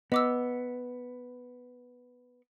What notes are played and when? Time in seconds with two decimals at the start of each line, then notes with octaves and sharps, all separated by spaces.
0.12 B3 D#5 D6 E6